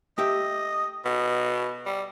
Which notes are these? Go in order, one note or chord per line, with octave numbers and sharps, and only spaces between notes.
A3 G4 D#5 E5
B2
G3